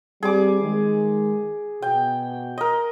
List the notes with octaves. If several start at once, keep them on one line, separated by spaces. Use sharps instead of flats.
G3 C4 G#4 D6
D#3 G#3
B2 F#4 G5
A#4 D#5